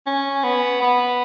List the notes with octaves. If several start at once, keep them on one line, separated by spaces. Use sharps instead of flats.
C#4
B3
B3